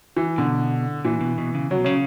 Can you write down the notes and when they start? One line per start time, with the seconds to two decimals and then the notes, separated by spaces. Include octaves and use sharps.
0.17 E3
0.38 B2 D3
1.05 A#2 E3
1.21 B2
1.38 B2
1.55 C#3
1.71 C#3 F#3
1.78 B2
1.85 C#3 C#4